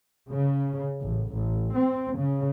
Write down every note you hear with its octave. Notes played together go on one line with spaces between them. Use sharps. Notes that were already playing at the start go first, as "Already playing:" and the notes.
C#3
A1
A1
C4
C#3